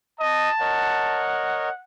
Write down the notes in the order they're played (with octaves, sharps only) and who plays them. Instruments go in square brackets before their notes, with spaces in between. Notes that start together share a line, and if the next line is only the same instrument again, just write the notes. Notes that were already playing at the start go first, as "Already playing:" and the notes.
[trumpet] D#5 [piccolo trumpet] A5
[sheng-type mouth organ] A#4 C#5 D#5 [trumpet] F#5